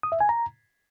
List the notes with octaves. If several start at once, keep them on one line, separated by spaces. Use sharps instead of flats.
D#6
E5
G#5
A#5